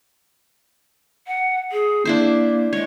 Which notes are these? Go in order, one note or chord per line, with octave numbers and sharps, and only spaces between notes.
F#5
G#4
A#3 D4 E4 C5
G#3 C#5